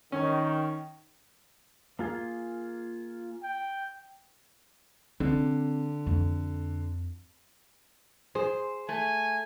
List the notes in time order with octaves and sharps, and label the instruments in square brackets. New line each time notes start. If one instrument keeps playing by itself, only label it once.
[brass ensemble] D#3 [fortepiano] C#4
[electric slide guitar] A#3 F4 G#4
[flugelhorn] G5
[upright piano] D3 [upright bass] C4
[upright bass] F2
[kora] G#4 [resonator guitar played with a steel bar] C5
[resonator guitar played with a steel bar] A3 [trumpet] G#5